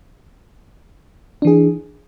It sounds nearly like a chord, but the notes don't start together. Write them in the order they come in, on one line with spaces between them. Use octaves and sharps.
D4 E3 G#4